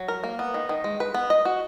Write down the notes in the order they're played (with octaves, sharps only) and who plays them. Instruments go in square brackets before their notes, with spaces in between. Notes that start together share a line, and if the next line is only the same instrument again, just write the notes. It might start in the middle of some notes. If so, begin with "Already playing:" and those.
Already playing: [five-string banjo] F#3
A#4
A#3
B3
D#3
D#3
G#3
B4
B3
D#5
F#4